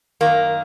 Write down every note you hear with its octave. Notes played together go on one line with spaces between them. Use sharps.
F#2 D#3 A#3